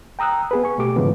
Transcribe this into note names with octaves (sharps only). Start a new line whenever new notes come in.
G5 A#5 D#6 E6 F#6
B3 G#4 B4
G#5 C#6
B2 A3 G4 D6
G#2 C#3 E3 F3 G#3 B3